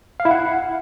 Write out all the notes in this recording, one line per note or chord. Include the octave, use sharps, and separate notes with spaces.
F5
E4
F#5